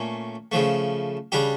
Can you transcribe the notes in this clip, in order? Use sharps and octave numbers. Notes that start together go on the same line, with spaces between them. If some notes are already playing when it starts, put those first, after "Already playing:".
Already playing: A#2 A3 C#4
C#3 F3 A3
C#3 G3 D4 G4